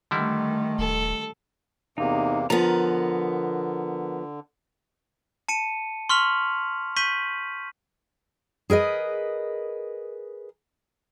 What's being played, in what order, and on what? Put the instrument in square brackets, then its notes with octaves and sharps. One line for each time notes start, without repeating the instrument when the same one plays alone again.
[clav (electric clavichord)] D3 G3 E4 [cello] D#3 A3
[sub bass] D1 [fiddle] A4
[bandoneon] E2 C3 A#3 [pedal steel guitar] D#4
[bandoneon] D3 [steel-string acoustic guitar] F3 B3 [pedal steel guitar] A#4 A#5
[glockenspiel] A5 C#7 D#7
C6 C#6 F6 B6 F7 F#7
C#6 G6 B6 D#7 F#7
[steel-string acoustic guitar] G#4 A#4 B4 D#5